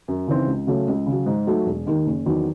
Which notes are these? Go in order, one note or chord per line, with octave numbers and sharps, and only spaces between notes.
F#2
C#3 E3 C4 D#4
C#2
C#3 F#3 A3 C#4
C#2
C#3
F#3
G#2
F#3 A3 D#4
E1
D#2 D#3
F#1
E2 D#3 F#3